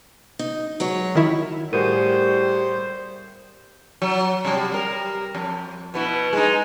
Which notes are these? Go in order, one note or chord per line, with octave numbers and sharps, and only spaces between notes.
D#4
F#3 G#3 C#5
D#3 E4
A2 G3 F#4 G#4 A#4 C5 D#7
F#3
C3 G3
G3 A#4
F2
B2 B3 E4
G#3 D#4